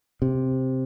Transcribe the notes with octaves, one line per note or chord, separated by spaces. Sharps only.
C3